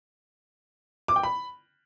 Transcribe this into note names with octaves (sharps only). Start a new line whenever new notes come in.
D6
G5
B5